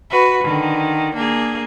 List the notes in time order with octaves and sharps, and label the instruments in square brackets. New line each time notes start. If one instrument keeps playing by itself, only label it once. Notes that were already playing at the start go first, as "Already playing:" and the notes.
[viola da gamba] F#4 B4
D3 D#3
A#3 D4 G#4